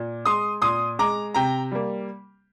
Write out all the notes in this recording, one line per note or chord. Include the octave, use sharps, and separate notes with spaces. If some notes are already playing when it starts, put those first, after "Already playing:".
Already playing: A#2
G#3 C6 D#6
A#2 C6 D#6
G#3 A#5 D6
C3 G5 A#5
G3 A#3